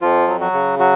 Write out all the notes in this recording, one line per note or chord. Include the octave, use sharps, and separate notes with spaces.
F2 F3 F4
F#3
F#3 F#4
C#3
F#3 F#4